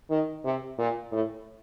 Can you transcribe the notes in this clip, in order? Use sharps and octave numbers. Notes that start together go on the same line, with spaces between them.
D#3
C3
A#2
A2